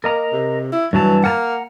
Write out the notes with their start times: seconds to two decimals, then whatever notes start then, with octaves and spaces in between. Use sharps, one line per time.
0.04 A#3 A#4 D#5 A#5
0.33 C3
0.72 E4
0.93 G2 E3 F#3 A5
1.24 A#3 F#5 A5 A#5